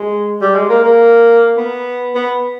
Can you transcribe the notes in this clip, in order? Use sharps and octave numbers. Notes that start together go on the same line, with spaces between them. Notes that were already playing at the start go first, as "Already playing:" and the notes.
Already playing: G#3
G3
G#3
A#3
A#3
B3
B3